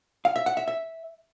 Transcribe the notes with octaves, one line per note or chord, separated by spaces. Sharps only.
F5
E5
F#5
E5
E5